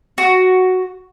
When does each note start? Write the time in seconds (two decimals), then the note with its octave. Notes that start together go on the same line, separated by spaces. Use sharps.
0.18 F#4